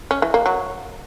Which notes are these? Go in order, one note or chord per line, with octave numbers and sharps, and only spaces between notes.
C#4
E3
A#3
F#3